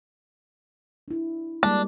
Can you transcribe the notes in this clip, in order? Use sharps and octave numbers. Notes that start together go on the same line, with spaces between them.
D4 E4
G3 G#3 A#3 D4